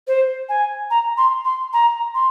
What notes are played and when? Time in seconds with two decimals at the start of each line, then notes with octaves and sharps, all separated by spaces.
0.07 C5
0.49 G#5
0.90 A#5
1.17 C6
1.45 C6
1.73 A#5
2.15 C6